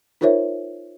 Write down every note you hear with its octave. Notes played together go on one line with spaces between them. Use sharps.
D#4 F4 A#4 C5 C#5 E5